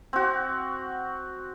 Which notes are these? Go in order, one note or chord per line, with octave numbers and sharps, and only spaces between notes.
C4 F#4